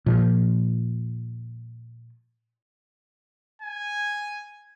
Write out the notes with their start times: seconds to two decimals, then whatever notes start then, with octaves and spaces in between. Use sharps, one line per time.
0.06 A#2 F3
3.62 G#5